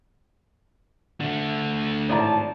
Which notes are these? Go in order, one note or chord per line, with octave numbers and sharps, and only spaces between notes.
D3 A3
G#1 A2 F3 D5 A5 A#5